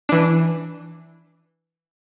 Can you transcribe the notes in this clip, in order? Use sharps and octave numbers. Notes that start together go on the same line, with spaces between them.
E3 D4